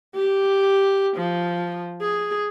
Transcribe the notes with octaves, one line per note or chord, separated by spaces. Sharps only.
G4
F3
G#4